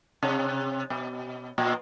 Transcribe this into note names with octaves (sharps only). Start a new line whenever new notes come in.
C3
B2
A#2